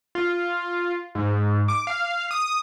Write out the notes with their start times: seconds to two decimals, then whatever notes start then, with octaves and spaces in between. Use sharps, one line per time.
0.15 F4
1.15 G#2
1.68 D6
1.87 F5
2.31 D#6